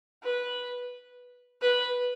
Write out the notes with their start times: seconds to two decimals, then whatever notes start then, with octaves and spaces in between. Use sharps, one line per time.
0.23 B4
1.62 B4